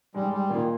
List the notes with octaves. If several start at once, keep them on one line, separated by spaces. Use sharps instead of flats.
G#2 G3 G#3
G3
A#2 D#3 A#3